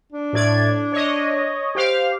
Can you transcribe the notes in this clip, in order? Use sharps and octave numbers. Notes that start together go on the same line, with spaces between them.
D4
A2 D5 G#6
C#5 D#5
G4 C5 F5